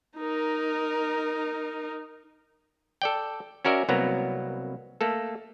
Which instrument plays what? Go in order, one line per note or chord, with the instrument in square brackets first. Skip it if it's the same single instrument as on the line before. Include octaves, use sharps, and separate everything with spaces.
[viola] D#4 A#4
[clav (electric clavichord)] A4 D5 G5
C#4 F#4 A#4 D5 E5
C2 F#3 A#3 B3 A#5
A3 A#3 A4